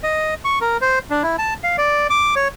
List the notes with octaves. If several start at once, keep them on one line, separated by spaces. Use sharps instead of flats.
D#5
C#6
A#4
C5
D4
E4
A5
F5
D5
D6
C#5